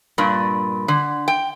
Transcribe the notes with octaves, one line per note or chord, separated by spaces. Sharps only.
G2 A#2
D3
G5